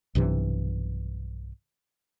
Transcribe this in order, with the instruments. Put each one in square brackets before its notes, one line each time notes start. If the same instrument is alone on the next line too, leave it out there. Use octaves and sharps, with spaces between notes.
[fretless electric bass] B1 G2 C3 E3